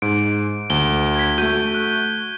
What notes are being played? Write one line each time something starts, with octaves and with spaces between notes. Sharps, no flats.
G#2 D7
D2 G7
G#6 B6
A3 F#4 G6 D#7 G7
F#6